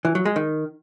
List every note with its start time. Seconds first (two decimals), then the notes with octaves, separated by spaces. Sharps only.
0.05 E3
0.15 F#3
0.25 G#3
0.36 D#3